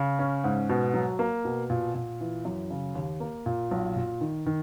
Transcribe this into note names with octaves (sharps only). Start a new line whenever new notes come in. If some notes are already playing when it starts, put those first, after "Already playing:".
Already playing: C#3
C#4
G#2
B2
F#3
A#3
B2
A#2
A#2
E3
F#2
C#3
D#2
A#3
A#2
B1
A#2
D#3
D#3